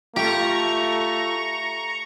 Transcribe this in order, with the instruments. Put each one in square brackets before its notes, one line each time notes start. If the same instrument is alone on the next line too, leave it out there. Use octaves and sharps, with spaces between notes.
[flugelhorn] A3 [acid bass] F4 [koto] G4 [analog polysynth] A#5 C#6